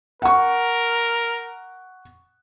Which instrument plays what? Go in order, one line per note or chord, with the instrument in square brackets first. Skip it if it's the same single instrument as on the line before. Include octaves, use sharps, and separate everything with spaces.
[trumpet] A#4 [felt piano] F#5 C#6